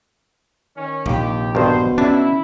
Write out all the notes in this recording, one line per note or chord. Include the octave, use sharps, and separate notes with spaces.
D#3 C#4
A#1 D#2 C3 G4
G2 B2 D#3 C5
C#4 D4 E4